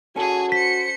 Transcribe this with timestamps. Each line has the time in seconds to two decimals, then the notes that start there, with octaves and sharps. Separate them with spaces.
0.16 C#4 F#4 G#4 A4 G#5
0.52 C5 B6 C#7